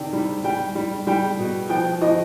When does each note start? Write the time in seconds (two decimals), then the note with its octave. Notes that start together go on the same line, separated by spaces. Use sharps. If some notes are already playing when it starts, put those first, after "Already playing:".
Already playing: C3 D#3 D5 G5
0.13 G3
0.44 G3 G5
0.75 G3
1.07 G3 G5
1.39 B2
1.69 F3 G5
2.02 F3 D#5